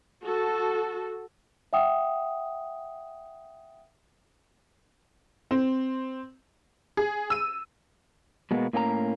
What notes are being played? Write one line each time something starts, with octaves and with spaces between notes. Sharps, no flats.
F#4 A4
E5 F#5 G5 D#6
C4
G#4
E6 D#7
B2 G#3 A#3 B3
A2 A#3 C#4 D4 A#5